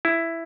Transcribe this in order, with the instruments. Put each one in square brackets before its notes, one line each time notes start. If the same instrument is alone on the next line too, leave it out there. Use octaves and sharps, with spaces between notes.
[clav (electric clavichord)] E4